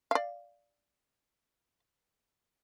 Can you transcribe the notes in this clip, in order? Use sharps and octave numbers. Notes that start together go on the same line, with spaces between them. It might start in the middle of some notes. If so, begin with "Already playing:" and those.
D5 F5